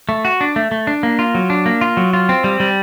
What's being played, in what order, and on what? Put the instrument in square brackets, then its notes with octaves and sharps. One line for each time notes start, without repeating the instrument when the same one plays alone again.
[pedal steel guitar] A3
F#4
D4
A3
A3
D4
A#3
F4
F#3
D4
A#3
F4
F#3
F4
C4
G3
G3